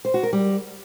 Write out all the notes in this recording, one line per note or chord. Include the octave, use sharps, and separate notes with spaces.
C5
F#4
A#4
G3